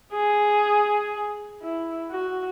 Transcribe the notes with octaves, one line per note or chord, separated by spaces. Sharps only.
G#4
E4
F#4